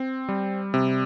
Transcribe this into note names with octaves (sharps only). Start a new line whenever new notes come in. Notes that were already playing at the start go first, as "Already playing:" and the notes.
Already playing: C4
G3
C3